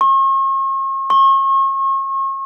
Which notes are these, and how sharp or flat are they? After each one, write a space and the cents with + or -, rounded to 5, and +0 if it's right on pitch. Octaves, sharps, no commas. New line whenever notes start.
C#6 -45
C#6 -40